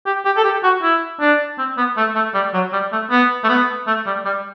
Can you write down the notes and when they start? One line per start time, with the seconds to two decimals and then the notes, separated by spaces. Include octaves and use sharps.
0.06 G4
0.25 G4
0.37 A4
0.44 G4
0.63 F#4
0.82 E4
1.20 D4
1.58 C4
1.77 B3
1.97 A3
2.15 A3
2.34 G3
2.53 F#3
2.72 G3
2.92 A3
3.11 B3
3.44 A3
3.49 B3
3.87 A3
4.06 G3
4.25 G3